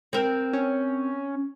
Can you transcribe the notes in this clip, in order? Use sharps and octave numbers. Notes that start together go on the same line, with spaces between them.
C4 A#4
C#4